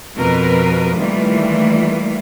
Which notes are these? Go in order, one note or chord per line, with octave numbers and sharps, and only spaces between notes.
F2 B2 A#4 B4
D#3 E3 G3 A3 A#3 F4